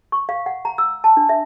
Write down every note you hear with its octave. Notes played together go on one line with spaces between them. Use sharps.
C#6
F5
F#5
A#5
E6
A5
D4
E5